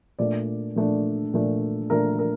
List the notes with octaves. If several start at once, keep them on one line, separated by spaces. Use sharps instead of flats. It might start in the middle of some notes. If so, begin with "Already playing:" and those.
A#2 A3 D4 D5
A#2 A3 D4
A#2 A3 D4
A#2 A3 D4 A#4
A#4